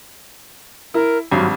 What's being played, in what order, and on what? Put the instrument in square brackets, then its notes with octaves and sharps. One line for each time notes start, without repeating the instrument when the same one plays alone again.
[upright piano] E4 [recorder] A#4
[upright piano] G#1 G2 [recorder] F#3